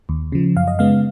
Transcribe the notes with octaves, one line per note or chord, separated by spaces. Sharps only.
D#2
C#3 F3
F#2 F5
D#5
C#3 G#3 B3 F5